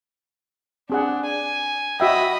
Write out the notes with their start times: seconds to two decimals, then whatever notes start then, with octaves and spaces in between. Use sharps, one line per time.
0.90 C4 D4 G#4 F#5
1.26 G#5
2.00 F#4 D#5 E5 G5 B5